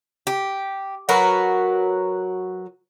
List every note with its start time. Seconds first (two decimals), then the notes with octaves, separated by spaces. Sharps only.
0.27 G4
1.09 F#3 F#4 A#4 B4